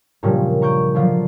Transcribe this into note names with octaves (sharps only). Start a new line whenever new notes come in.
G2 A#2 C#3 F3 G3
A#5 C#6 G6 D7
D3 F3 F#3 D4 F4